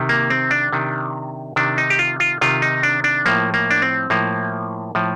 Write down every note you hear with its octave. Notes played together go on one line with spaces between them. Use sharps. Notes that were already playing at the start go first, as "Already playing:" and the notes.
Already playing: C3 D#3
A#3
C4
D4
C3 D#3
C3 D#3 D4
D#4
G4
F4
F4
C3 D#3 F4
D#4
D4
D4
A2 F3 A#3
A#3
D4
C4
A2 F3 A#3
A2 F3